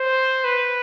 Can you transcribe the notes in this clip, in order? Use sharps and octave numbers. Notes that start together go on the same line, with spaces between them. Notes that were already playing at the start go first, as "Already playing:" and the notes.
Already playing: C5
B4